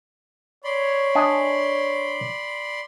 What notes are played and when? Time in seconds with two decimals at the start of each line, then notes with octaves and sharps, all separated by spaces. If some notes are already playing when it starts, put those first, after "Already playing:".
0.64 C#5 D5 B5 C6
1.15 D4 D#5 G#5